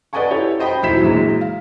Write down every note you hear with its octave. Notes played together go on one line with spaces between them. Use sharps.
B4 D5 D#5 F#5 G#5 C#6
E4 G4 A4 C#5
C5 D#5 G5 B5
D#1 F#3 E4 C5 B6 E7
A#1 E3 F#3 G#3
F5